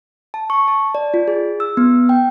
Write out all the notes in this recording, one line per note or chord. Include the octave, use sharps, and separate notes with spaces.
A5
C#6
A5
D5
F4
G#4
E6
B3
G5